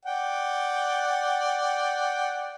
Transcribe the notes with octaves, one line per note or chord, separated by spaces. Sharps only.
D5 F#5 G5